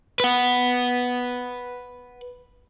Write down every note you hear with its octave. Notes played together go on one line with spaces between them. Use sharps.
B4 F#5